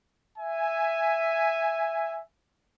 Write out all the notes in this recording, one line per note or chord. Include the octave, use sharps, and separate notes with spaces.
E5 G#5